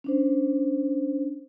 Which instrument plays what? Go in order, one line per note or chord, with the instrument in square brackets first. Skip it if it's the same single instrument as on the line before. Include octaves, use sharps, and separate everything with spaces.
[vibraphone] C#4 D4 C5